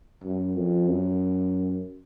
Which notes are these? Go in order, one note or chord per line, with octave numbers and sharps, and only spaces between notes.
F#2
F2
F#2